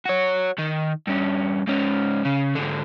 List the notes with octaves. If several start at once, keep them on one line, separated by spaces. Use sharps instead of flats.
F#4 C#5
D#3
G2 C#4
G#2 C#4
C#3
G#2 D3